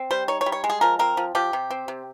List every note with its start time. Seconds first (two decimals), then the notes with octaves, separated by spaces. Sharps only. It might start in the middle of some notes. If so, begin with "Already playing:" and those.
Already playing: C4
0.11 G3 C5
0.28 D#4 C#5
0.41 C#5
0.46 G3
0.52 C#5
0.64 G#3
0.70 G#4
0.81 F3 A#4
0.99 C4 A#4
1.17 F3
1.35 F3 G4
1.53 C3
1.70 C4
1.88 C3